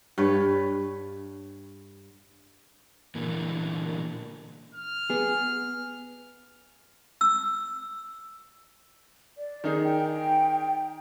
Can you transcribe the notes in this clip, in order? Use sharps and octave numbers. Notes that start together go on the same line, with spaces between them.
G2 B4 C#5
A#2 D3 E3 A#3
F6
B3 G#4
E6
D5
D#3 D#4 G#4
G5